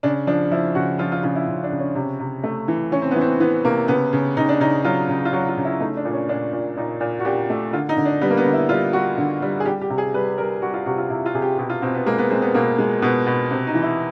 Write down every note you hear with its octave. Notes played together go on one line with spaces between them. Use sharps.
C#3 D4
F3 D4
F3 E4
C#3 F#4
F3 F4
F4
C#3 F4
E4
C#3
D4
C#3
C#4
C3
C3
A3
E3
E3 C#4
C4
E3 B3
C4
E3 B3
C3 A#3
C#3 B3
C#3
C#3 D#4
D4
C#3 D#4
F#3 F4
C#3
F4
F#3 F#4
F4
C#3
E4
A3 D#4
D4
A#2
C#4
A#2 D4
A#2
A#2 D#4
A#2
F#4
A#2 G4
A3
D3 F4
D#4
D3
D4
G3 B3
A#3
B3
D3
E4
G3 F4
G3 F#4
D3
G3
G#4
G3 G4
G4
C3
G#4
G3 B4
G3 A#4
G3 F#4
F4
C3 F#4
F4
C3 E4
F4
C3 G#4
G4
B2 G4
F4
B2 C4
B3
G#3 A#3
B3
G#3 C4
B3
B2 A#3
G#3
B2 B3
B2
C3 C4
D#4
E3
E4